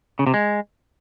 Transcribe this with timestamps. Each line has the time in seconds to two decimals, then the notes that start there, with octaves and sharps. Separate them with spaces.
0.19 C#3
0.27 C3
0.34 G#3